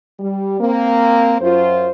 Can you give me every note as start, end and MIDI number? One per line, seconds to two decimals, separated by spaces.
0.20 0.57 55
0.60 1.36 58
0.60 1.36 60
1.41 1.90 42
1.41 1.90 65
1.41 1.90 72